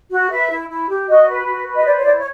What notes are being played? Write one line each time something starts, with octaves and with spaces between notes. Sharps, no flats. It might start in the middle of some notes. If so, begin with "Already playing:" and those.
F#4
B4 E5
E4
E4
G4
F#4 D#5
B4
F#4
B4
D#5
C5 D5
C#5
E4 D5
C#5